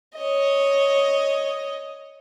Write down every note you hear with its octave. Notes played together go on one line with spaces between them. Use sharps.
C#5 D#5